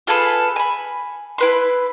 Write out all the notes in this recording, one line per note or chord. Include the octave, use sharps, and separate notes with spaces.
F4 G#4 A4 B4
G#5 B5
E4 B4 C6